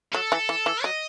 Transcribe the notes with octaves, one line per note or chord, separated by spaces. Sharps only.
F#3 A4
E3
E3
E3
F#3 D#5